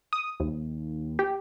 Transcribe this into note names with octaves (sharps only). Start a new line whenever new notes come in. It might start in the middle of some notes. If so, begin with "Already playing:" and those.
D#6
D#2
G4